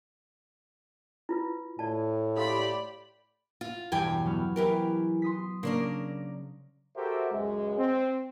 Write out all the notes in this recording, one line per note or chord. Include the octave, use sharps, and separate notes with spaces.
E4 F4 B4
A2 D5 A5
G4 A4 D5 F5 B5 C6
F4
E1 E2 G2 G4 G5 G#5
F#3 B3 F6
E3 G4 A#4
C6 D#6 B6
C#3 A#3 C#4 D4 A#4 C7
F#4 G4 A4 A#4 C5 E5
C#2 F#2 G#3
C4